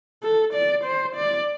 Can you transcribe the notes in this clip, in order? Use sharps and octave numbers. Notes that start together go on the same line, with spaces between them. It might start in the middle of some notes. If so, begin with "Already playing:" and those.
A4
D5
C5
D5